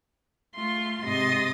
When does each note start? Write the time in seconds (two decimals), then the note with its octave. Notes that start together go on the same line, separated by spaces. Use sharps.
0.55 A3 F4 C6
1.04 G#2 C3 D#5 C6 D#6 A6